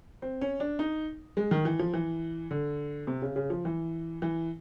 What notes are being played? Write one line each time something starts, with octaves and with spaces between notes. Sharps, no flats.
C4
C#4
D4
D#4
G#3
D#3
E3
F3
E3
D3
C3
C#3
C#3
F3
E3
E3